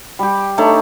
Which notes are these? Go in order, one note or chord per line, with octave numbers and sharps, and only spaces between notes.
G3 G4
A3 D4 D#4 C#5